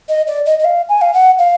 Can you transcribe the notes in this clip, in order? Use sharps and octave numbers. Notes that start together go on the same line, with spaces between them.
D#5
D5
D#5
D#5
F5
G#5
F5
F#5
F5